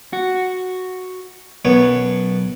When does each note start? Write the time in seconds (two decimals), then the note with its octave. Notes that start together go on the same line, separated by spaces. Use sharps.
0.13 F#4
1.65 B1 F#2 B3 C#5